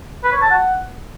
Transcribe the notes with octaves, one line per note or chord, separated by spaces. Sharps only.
B4
C#5
A5
F#5